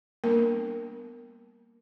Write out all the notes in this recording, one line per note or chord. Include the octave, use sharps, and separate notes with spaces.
G3 A#3 B3 D4 A#4